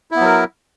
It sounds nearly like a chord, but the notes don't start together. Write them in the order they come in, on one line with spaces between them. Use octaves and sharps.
E4 B3 F#3 A#4